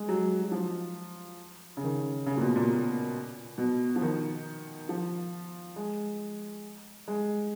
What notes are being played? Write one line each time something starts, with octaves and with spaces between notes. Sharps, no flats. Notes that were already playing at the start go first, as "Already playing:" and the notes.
Already playing: G#3
F#3
F#3
F3
C#3
D#3
C#3
A#2
B2
A#2
A#2
B2
F3
D#3
F3
G#3
G#3